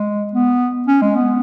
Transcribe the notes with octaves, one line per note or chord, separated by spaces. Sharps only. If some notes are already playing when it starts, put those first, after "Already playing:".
Already playing: G#3
B3
C#4
G#3
B3